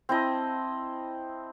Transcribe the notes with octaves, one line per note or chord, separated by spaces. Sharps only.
C4 E4 D#5 A5